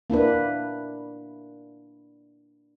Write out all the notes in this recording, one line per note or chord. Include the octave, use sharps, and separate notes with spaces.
A#3 D4 E4 B4